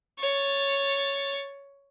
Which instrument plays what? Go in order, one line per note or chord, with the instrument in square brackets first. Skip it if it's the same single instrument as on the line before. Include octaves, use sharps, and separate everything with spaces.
[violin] C#5 A6